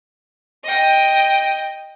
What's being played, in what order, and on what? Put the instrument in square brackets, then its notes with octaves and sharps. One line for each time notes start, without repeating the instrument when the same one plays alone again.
[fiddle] D#5 G5